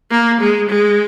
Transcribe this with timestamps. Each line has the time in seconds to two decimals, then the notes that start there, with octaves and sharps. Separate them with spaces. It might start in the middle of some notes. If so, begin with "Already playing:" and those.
0.11 A#3
0.41 G#3
0.69 G#3